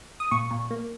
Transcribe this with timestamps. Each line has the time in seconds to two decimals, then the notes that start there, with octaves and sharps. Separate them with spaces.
0.20 D#6
0.31 A#2 C#6
0.51 A#2
0.71 A#3